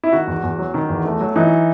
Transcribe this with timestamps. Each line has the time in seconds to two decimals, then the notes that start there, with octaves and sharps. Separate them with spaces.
0.04 E4
0.12 D#3 F#4
0.27 E2
0.43 E2
0.59 F#3
0.74 D#3
0.89 E2
1.05 A3
1.21 F#3
1.36 E3 D#4